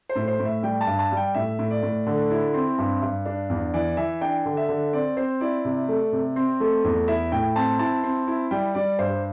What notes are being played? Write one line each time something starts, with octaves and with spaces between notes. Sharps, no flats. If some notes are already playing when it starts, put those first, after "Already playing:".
C5
A2
C5
A2
E5
G3 G5
A5
G2
A5
G3
G5
A2 E5
A2
D5
A2
D3
E4
C4
G2
G2
D4
E2
E3 D5
E3 E5
D4 G5
D3
E5
D3
C4 D5
C4 C5
E4 D5
C3
A3
C3
C4
A3
E2
E4 E5
A2 G5
C4 A5
E4 A5
C4
E4
G3 G5
G3 D5
G2 C5